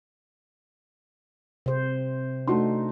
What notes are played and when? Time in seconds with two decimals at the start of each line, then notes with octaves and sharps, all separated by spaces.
1.66 C3 C5
2.47 A3 D4 D#4 F#4 C6